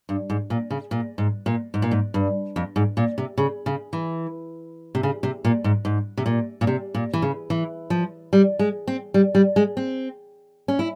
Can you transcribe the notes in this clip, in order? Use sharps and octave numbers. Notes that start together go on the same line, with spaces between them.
G2
G#2
A#2
C#3
A#2
G#2
A#2
G#2
A#2
G#2
G2
F2
G#2
A#2
C3
C#3
C#3
E3
C3
C#3
C3
A#2
G#2
G#2
C3
A#2
A#2
C3
A#2
E3
C#3
E3
F3
G3
G#3
C4
G3
G3
G#3
C4
C#4
E4